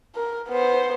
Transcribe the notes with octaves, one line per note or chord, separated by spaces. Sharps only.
A#4
B3 C5